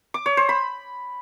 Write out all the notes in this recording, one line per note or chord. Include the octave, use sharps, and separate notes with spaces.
D6
C#5
C5
B5